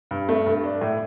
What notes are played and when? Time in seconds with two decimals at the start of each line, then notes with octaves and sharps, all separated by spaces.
0.11 G2
0.29 A3
0.46 G2
0.64 D4
0.81 A2